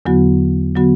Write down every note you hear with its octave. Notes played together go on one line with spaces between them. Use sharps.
E2 D3 F#3 B3 F#4
D3 F#3 B3 F#4